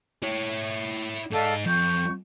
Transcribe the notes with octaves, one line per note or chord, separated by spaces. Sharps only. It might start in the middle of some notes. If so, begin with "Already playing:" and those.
E4 C#5
G#2 A4 D5 D#5 F5
F2 C#6 G6